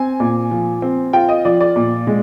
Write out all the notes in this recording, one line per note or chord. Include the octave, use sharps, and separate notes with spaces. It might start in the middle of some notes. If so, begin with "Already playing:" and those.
Already playing: C4 G#5
A#2
F3
C4
F4 G5
D#5
F3 D5
D5
A#2
G#3